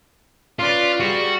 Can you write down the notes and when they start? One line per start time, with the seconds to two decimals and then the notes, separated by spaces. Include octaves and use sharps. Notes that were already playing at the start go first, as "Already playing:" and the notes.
0.59 C#4 F4 B4 D5
1.00 G3 F#4 G#4